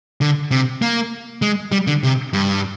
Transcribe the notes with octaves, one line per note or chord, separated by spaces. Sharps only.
D3
C3
A#3
G#3
G3
D3
C3
G2